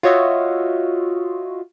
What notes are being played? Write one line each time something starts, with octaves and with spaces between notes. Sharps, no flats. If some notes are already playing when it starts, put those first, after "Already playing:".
F4 F#4 C#5 D#5 E5